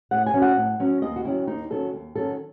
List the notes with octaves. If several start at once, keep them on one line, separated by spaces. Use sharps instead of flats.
A2 F#5
G#5
F#3 C#4
F#5
A2
F#3 C#4
D#2 D#5
F#4
D#3 F#3 C#4 E4
D#2 D#4
D#3 F#3 C#4 A4
D#2
D#3 F#3 C#4 A4